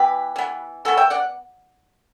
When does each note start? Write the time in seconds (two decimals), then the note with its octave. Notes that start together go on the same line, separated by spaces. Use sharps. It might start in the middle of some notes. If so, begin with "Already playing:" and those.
Already playing: E3 B3 G4 B4
0.36 E3 B3
0.85 E3 B3 F#4 A4
0.97 E5 G5
1.10 D5 F#5